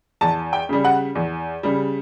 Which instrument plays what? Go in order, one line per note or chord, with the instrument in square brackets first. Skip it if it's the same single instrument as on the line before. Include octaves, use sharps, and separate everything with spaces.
[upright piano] E2 A5
G5
C#3 G3
F#5
E2
C#3 G3